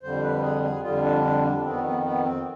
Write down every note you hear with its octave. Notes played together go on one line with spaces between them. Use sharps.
F2 D3 G3 C5
B4
G#4
G#4
F2 D3 G3 F4
D4
D4
D4
F2 D#3 B3 C4
B3
B3
C4